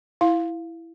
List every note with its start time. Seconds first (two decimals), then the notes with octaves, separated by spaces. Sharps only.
0.21 E4 F5